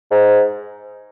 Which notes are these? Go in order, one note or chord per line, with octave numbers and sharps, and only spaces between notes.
G#2